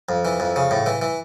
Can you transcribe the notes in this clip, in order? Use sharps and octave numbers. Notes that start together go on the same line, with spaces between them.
F2
E3
F2
C#3
A2
E3
E3